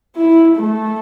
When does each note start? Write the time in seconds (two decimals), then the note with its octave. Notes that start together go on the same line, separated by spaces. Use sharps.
0.16 E4
0.57 A3